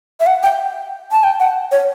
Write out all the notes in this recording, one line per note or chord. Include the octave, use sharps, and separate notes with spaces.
E5
F#5
G5
A5
G5
F#5
C#5